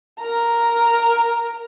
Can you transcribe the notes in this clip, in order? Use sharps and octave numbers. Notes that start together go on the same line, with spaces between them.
A#4 A#5